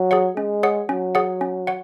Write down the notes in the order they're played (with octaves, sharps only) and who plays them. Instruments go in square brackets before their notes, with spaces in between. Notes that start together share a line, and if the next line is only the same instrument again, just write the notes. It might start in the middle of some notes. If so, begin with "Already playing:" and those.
Already playing: [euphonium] F#3
[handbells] G#4 C#5 F#5
[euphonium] G#3 [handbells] C#4
[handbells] G#4 C#5 F#5
[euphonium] F#3 [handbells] C#4
[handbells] G#4 C#5 F#5
C#4
C#5 F#5